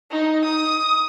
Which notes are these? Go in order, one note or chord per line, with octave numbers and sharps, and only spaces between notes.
D#4
D#6